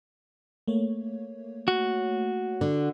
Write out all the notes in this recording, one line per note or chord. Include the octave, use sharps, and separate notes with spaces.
A3 A#3 C#5
F#4
D3